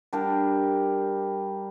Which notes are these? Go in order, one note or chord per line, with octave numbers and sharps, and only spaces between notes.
G3 D4 G4 A#4